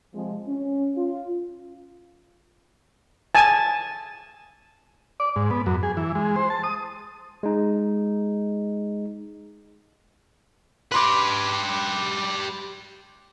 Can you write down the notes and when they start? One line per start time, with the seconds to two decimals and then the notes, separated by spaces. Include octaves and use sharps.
0.14 C3 F3 G#3
0.48 C#4
0.96 F4
3.35 G#5 A5
5.20 D5
5.36 G#2
5.51 B3
5.66 F#2
5.83 G#4
5.97 E3
6.15 G#3
6.36 C5
6.50 A5
6.64 D#6
7.43 G#3 D#4
10.92 G4 B4 B5 C6 D6